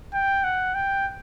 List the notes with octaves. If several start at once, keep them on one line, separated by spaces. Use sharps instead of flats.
G5
F#5
G5